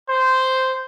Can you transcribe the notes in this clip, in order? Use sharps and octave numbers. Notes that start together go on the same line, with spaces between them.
C5